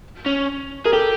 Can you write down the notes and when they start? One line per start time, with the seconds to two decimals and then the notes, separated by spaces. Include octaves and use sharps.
0.26 C#4
0.85 G#4 A#4
0.93 G4 A4